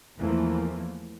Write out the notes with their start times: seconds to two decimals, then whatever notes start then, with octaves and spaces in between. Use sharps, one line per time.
0.19 E2 E3 F3 A3 A#3